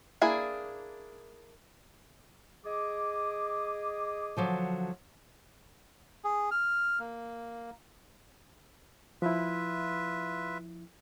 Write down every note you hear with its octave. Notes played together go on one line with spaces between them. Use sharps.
A#3 D4 E4 G#4
G#4 D#5 D6
D3 F3 F#3
G#4
F6
A#3
F3 E4 F4 B4 E5